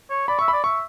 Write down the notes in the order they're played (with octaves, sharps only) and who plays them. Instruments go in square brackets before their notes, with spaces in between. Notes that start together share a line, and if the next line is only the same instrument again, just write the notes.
[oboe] C#5
[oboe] D5 [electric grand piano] B5
[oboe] E5 [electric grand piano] C#6
[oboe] D5 [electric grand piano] B5
[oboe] E5 [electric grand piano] C#6